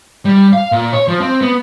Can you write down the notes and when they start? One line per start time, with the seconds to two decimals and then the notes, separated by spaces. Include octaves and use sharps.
0.25 G3
0.53 F5
0.72 A#2
0.93 C#5
1.08 F3
1.20 C4
1.41 B3